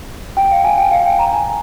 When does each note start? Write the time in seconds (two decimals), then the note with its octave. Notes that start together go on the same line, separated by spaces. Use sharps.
0.37 G5
0.51 F5
0.64 G#5
0.78 G5
0.91 F5
1.05 G5
1.19 A#5
1.33 G#5